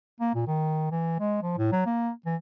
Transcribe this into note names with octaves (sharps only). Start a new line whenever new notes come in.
A#3
A#2
D#3
E3
G#3
F3
A2
F#3
A#3
E3